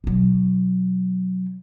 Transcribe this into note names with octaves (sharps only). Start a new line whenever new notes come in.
B2 F#3